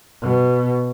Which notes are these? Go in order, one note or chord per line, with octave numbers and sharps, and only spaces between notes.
B2